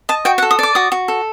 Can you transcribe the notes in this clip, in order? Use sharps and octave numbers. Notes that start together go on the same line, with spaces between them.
D#5 A5
F#4 G5
F#5
A4
D#6
D5 D6
F#4 D#6
F#4
A4